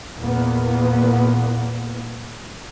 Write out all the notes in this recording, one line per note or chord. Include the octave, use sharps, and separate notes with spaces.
E2 A#2 A#3 B3